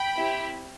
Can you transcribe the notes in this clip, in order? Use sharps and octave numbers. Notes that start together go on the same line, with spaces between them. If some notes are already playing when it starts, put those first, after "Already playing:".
Already playing: G5 B5
C4 E4 G4